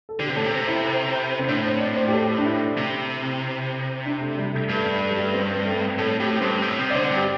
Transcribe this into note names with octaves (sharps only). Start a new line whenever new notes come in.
A4
D3 G4
C3
A2 A4
C3
C5
E4
C4
A2 D4
C5
D5
C5
G4
A4
D4
E4
C3
D4
A3
G3
A3
G2 A3
A3
A3
G3
A3
C4
C4
A3
A2 A4
A2 G4
G2 C4
A2
C3
D5
D3 C5
G2
G4